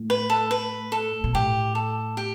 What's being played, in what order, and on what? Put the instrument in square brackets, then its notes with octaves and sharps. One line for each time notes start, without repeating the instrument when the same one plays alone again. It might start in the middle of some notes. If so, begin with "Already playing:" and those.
Already playing: [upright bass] A2
[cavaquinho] B4
A4
B4
A4
[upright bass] B2
[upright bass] A2 [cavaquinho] G4
[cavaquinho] A4
G4